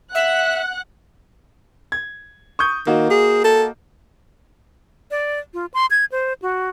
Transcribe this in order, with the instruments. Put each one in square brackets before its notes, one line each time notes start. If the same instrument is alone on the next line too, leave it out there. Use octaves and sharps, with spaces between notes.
[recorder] E5 [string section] F#5 F#6
[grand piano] G#6
C#6 D#6 G6
[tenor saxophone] D#3 [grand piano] A#3 F#4 D#5
[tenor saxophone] G#4
A4
[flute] D5
F4
C6
G#6
C5
F#4